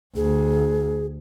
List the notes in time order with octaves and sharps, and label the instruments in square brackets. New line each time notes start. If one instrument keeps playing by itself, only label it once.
[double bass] D2 [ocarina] G#4